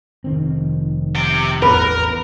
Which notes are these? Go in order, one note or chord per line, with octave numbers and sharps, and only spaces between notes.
F1 D#3 C4
C3 G5
A1 E2 A2 A#4 B4